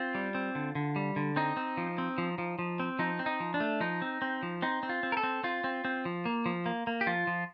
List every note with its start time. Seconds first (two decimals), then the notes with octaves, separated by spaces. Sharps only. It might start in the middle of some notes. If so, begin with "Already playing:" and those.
Already playing: C4 F4
0.15 G3
0.35 C4
0.55 D3
0.75 D3
0.96 G3
1.16 D3
1.36 C4 D#4
1.57 C4
1.77 F3
1.98 C4
2.18 F3
2.38 F3
2.59 F3
2.80 C4
2.99 F3 D#4
3.19 C4
3.26 D#4
3.40 F3
3.54 D4
3.60 A3
3.80 F3 D#4
4.02 C4
4.22 C4
4.43 F3
4.62 C4 D#4
4.83 C4
4.89 F4
5.03 C4
5.12 A#4
5.17 A4
5.23 C4
5.44 C4 F4
5.64 C4
5.85 C4
6.05 F3
6.25 A#3
6.46 F3
6.66 A#3
6.87 A#3
7.01 G4
7.07 F3 F4
7.27 F3